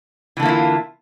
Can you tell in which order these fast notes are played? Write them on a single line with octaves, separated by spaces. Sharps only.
E3 D3 A#3 E4 F4